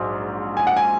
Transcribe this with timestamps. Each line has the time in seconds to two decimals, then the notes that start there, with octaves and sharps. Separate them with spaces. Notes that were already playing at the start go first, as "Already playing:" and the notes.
Already playing: A#1 G#2 F#3
0.57 G#5
0.67 F#5
0.77 G#5